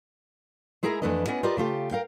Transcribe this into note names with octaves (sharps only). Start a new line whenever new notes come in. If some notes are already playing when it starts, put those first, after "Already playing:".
G#3 E4 G#4 A#4 E5 A#5
F2 E3 A3 D4 B4 D#5
B3 C#4 E4 D5 D#5
F4 G4 A#4 B4 D5 D#5
C#3 A3 F4 G4
A#4 F5 G5